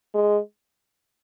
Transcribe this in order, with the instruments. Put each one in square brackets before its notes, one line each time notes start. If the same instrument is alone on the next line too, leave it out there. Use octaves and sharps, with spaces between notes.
[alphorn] G#3